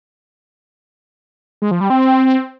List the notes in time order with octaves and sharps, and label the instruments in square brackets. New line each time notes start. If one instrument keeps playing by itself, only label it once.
[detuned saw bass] G#3
F3
G3
C4